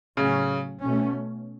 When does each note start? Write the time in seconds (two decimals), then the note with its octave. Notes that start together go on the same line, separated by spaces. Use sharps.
0.16 A2 C#3 F#3 C#4
0.82 B2 A3 C#4